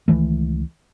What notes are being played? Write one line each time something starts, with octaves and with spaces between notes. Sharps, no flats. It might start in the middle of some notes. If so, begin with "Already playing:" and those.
C#2 D#3 E3 A3